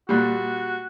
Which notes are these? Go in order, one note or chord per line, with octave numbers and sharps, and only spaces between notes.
A#2 G3 F#4